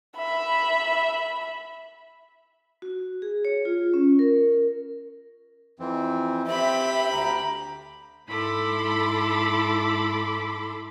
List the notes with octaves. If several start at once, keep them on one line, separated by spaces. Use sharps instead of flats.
E5 B5
F#4
G#4
C#5
F4
C#4
A#4
F2 E3 C4
C4 G4 E5 B5
D2 A#5
G#2 E4 A4 B5 C6 D6